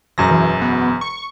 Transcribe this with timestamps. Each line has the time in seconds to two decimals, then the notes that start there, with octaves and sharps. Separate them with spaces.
0.18 E1 F#2 A#6
0.31 E3
0.61 B3
1.01 C#6